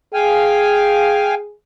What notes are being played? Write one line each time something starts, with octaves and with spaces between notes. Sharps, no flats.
G#4 F5 G5 G#5